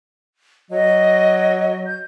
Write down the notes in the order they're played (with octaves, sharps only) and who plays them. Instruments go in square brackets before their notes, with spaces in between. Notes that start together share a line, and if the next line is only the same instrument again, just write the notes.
[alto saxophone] F#3 [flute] D#5
[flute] G6